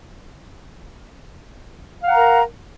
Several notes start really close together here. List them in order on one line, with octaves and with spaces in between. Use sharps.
F5 F#5 A#5 A#4